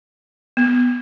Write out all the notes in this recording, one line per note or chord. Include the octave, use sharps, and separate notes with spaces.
B3